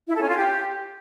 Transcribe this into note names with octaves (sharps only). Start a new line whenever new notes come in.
E4
A4
C#4
F4
G4